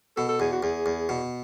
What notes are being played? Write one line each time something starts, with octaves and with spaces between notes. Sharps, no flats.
B2 A4
A4
E2 G#4
F#4
E2 G#4
E2
B2